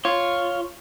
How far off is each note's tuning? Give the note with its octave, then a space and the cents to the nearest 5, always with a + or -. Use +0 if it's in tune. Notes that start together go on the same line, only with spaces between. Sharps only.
F4 +0 C#5 +0